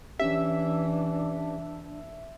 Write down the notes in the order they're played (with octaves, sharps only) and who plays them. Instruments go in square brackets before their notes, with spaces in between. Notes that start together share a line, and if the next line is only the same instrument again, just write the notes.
[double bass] E3 [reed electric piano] C#4 G4 [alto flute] D4 [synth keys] E5